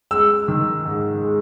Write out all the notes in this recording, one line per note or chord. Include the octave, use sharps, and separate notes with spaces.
G#3 E6
D#3
G#2
G#3